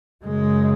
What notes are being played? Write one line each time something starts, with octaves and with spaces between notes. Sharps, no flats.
F#2 C#3 G#3